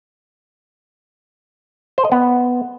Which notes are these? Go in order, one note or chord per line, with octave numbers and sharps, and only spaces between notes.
C5
D#5
B3